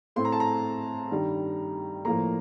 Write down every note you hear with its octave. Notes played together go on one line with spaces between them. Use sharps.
A2 A3 C4 C6
A#5
A5
A#5
G2 D#3 G3
A2 F3 A#3 A#5